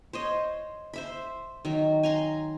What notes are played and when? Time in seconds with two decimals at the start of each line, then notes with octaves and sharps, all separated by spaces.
0.13 C5 C#5 D#5
0.93 C5 E5 B5
1.65 D#3 F#3
2.03 G#5 A#5 C6